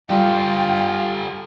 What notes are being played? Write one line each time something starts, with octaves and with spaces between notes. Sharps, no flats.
G3 F4 G4 A4 G5